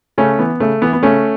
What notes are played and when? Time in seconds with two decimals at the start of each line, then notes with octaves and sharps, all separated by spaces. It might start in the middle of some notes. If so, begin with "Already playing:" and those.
0.18 C#3 A3 C#4
0.39 E3 B3
0.60 C#3 A3
0.82 E3 B3
0.93 B3
1.03 C#3 A3 C#4